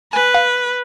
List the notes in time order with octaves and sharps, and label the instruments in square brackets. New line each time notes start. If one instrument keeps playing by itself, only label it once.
[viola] B4 [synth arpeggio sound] G#5
[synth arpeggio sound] F5